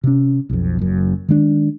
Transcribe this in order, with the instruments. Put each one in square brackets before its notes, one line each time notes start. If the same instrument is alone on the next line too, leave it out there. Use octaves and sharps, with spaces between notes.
[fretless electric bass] C3 C#4
B1 F2
F#1 F#2
D#3 G#3 A#3 D4